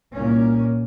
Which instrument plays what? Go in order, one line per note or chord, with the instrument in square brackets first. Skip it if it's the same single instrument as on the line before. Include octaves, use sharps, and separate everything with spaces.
[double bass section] C2 A#2 A#3 C#4